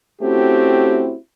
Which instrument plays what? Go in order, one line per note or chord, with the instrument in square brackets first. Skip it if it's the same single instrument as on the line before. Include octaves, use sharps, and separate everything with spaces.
[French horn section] A3 C4 C#4 E4 F#4 G4